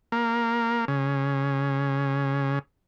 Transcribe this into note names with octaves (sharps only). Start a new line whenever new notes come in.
A#3
C#3